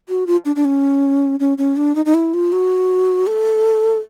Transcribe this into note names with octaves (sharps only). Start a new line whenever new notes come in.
F#4
F4
D4
D4
C#4
C#4
C#4
D4
D#4
D#4
E4
F4
F#4
A4